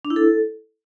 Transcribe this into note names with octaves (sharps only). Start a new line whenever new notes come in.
D4
E4
A4